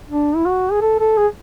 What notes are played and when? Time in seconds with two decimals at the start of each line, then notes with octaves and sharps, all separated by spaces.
0.09 D4
0.35 E4
0.46 F#4
0.72 G#4
0.81 A4
1.00 A4
1.18 G#4